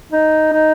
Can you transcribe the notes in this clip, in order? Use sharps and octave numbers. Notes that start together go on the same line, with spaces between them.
D#4
D#4